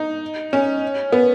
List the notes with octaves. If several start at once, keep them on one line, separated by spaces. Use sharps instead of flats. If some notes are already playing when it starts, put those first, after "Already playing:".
Already playing: D#4
C#4
B3